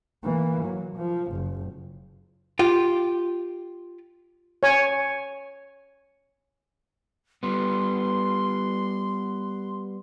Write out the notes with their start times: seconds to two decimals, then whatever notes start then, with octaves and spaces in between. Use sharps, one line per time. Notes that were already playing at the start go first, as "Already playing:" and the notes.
0.24 E3 A#3
0.64 F#3
0.96 F3
1.33 F#1
2.59 F4 G4
4.63 C#5 G#5
7.43 G3 B3 C6